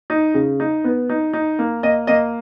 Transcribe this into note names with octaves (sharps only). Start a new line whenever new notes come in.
D#4
C#3
D#4
B3
D#4
D#4
A#3
A#3 D#5
A#3 D#5